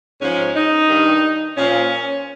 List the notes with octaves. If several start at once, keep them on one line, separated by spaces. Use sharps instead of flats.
G#2 F3 C#4
D#4
G2 D#3
A#2 F3 C#4